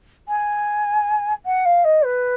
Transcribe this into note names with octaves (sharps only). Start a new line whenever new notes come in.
G#5
F#5
F5
D#5
B4